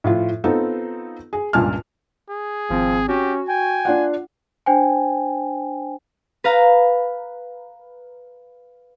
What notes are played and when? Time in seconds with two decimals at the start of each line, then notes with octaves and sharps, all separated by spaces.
0.04 A2 F3 F4
0.44 B3 C4 D#4 F4 A4
1.33 G#4
1.53 C#2 G2 A#2 G#5 A5 F6
2.29 G#4
2.70 G#1 F3 C4
3.09 C#4 F#4 G4
3.49 G5 G#5
3.85 D4 F4 F#5
4.66 D4 C5 G5 G#5
6.44 B4 F5 A#5